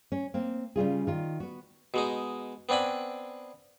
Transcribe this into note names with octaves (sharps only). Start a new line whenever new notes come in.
C#4
A#3 C4
C#3 G3 F4 G#4
D#3 F4
B3 F#4
B2 G#3 D#4
B3 C4 D4 G#5 B5